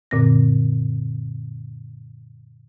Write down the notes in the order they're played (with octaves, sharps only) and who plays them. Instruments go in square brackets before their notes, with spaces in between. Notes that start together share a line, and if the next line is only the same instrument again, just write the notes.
[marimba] F#2 A#2 D3 C4 A#6